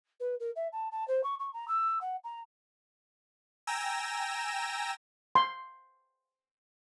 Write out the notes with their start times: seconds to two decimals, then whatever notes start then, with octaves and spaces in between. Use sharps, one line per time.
0.20 B4
0.40 A#4
0.56 E5
0.72 A5
0.91 A5
1.07 C5
1.23 C#6
1.39 C#6
1.53 A#5
1.68 E6
2.01 F#5
2.24 A#5
3.67 G5 G#5 A#5 E6 A#6 E7
5.35 C6